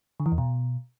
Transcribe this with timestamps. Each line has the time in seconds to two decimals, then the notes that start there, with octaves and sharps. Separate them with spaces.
0.20 D3
0.26 E3
0.32 E2
0.38 B2